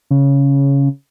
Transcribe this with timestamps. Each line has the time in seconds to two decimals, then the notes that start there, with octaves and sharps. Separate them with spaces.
0.11 C#3